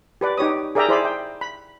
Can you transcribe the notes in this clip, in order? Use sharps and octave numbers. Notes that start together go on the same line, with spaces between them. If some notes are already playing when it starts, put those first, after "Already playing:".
G4 B4 D5
D#4 G4 C#5 D#6
G#4 A#4 D5 E5 G5 A#5
E4 G#4 C5 D5 B5
G5
B5